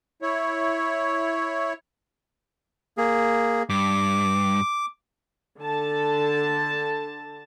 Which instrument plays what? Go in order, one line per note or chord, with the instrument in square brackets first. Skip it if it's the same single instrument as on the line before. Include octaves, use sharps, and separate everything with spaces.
[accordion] E4 C#5
[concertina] A#3 G#4
[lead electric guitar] G2 [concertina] D6
[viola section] D3 A5